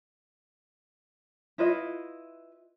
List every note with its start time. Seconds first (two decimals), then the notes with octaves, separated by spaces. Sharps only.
1.58 E4 F4 B4 D#5